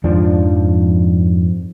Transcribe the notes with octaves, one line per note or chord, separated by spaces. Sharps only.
F2 G#2 F3 D4